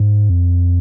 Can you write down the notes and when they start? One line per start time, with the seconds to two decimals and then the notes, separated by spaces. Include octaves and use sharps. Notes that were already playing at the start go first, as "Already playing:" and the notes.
Already playing: G#2
0.30 F2